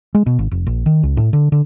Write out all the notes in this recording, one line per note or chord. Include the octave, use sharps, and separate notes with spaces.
G#3
B2
G#1
F1
A#1
D#3
C#2
A2
D3
D3